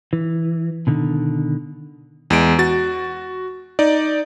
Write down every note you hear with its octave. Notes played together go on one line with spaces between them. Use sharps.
E3
B2 D3 D#3
E2 G#3 D7
F#4 A6
D#4 D5